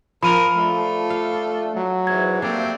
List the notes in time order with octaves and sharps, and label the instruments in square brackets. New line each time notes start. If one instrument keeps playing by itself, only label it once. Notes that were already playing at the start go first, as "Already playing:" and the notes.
[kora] F3 [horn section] A#4 [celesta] B5 D#7 F7
[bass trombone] A3 [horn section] D4 F4 A4
[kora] F5
[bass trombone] F#3
[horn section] G#2 E3 [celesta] G#6
[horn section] G3 A3 C4 [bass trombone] A#3 [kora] D4